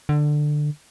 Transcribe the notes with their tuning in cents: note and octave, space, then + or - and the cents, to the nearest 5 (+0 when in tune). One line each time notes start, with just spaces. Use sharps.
D3 +15